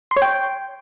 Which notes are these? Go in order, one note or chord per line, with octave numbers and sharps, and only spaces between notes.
C6
C#5
G5